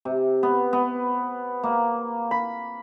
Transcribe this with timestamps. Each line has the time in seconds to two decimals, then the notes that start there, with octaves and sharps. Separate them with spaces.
0.05 C3
0.43 B3
0.73 B3
1.63 A#3
2.31 B5